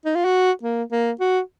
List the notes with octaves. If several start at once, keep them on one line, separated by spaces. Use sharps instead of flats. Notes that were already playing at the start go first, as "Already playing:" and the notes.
D#4
F4
F#4
A#3
A#3
F#4